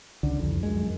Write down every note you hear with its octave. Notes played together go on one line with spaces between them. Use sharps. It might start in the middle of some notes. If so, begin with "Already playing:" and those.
C#2 D3
C2 F2
F#2 G#3